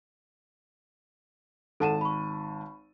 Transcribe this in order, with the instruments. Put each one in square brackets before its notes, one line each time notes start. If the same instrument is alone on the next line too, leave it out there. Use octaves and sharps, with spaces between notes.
[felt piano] G#1 A5 D#7 [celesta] A4 F#5 E7
[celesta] B5 C#6